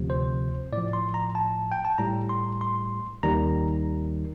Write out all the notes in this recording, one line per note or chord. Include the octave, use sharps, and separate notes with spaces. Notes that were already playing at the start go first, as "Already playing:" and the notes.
Already playing: D2 C3 F3
C5
A2 F3 D5
C6
A#5
A5
G5
A5
A2 G3 A#5
C6
C6
D#2 D#3 G3 A#5